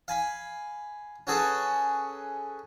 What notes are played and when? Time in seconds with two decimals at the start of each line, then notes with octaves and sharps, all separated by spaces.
0.08 F5 G#5 B5
1.27 C#4 F#4 G#4 A4 B4